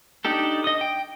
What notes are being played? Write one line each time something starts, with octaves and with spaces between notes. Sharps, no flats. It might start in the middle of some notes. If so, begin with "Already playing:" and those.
D4 D#4 G4 A4
D#5 D#6
G5